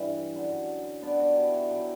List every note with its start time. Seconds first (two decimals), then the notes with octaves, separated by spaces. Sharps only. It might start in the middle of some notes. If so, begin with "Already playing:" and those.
Already playing: G2 E3 G3
0.34 F#2 D3 F#3
1.02 B2 G3 B3 D4
1.19 D4 F#4
1.37 E4 G4
1.54 F#4 A4
1.71 F#3 G4 B4